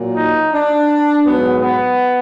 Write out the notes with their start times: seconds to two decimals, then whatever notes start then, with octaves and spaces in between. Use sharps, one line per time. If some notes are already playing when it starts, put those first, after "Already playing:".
Already playing: A#2 F#3
0.16 D#4
0.53 D4
1.25 G#2 F#3 B3
1.62 B3